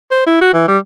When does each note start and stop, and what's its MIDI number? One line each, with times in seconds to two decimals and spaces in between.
0.11 0.26 72
0.26 0.39 64
0.41 0.53 66
0.54 0.67 52
0.68 0.77 55